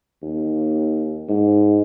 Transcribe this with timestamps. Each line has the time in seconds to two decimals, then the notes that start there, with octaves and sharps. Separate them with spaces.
0.23 D#2
1.29 G#2